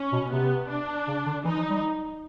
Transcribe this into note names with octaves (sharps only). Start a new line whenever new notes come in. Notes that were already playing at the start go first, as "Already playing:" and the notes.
Already playing: C#4
B2
C3 B3
D4
C#3
D3
E3 D#4
F3
G3